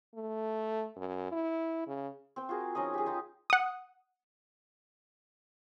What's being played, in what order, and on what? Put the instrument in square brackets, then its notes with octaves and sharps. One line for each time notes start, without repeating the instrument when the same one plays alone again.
[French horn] A3
F#2
E4
C#3
[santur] C4 G5
F4 F#4 G#4 A#4
F3 C#4 D#4 D#5
G4 G#4
D#4 F4 G4 G5
[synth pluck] F#5 D#6